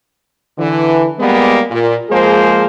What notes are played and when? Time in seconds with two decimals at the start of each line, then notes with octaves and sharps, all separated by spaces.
0.58 D3 E3
1.19 G3 G#3 A#3 B3
1.70 A#2
2.10 F3 G#3 A#3 G#4 C5